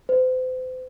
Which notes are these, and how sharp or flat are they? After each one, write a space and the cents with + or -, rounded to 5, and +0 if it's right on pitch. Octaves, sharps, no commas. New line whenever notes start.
C5 -40